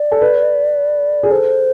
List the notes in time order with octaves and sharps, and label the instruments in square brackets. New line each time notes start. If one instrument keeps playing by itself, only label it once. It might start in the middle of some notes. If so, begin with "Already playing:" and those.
Already playing: [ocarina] D5
[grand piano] A4
B4
G#4
[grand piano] A4 [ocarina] C5